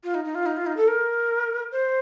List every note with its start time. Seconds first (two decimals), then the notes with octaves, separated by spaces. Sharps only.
0.04 F4
0.14 D#4
0.25 D#4
0.35 F4
0.46 D#4
0.57 F4
0.66 D#4
0.77 A4
0.88 A#4
1.72 C5